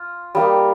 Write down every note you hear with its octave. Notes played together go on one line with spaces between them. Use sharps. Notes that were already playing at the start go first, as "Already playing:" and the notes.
Already playing: F4
G3 A#3 D#4